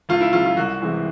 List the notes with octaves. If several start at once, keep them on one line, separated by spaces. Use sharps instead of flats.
C#2 F4
E4
C#3 F#3 F4
F4
C2 F#4
C3 E3 G#3